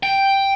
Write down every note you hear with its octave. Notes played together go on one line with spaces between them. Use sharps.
G5